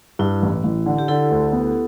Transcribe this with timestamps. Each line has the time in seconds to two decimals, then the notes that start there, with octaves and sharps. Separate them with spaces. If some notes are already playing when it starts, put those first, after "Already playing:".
0.19 G2 E4
0.42 A1
0.64 A1
0.86 D3
0.99 G4
1.08 D3 E4 A4
1.31 D2
1.52 B3